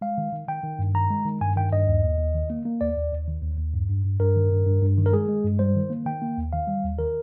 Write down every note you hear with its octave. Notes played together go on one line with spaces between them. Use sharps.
G#3 F5
D#3
D#3
D#3 G5
D#3
G2
D#3 A#5
G#3
D#3
G2 G#5
D#3 G5
G2 D#5
D#2
D#2
D#2
D#3
A#3
A#3
D#2 D5
D#2
D#2
D#3
D#2
D#2
G2
G2
G2
G2 A#4
D#3
G2
G2
G2
D#3
A#4
G#3 G#4
G#3
G2
G3 C5
D#3
A#3
D#3 G5
A#3
D#2
D#3 F5
G3
D#2
D#3 A#4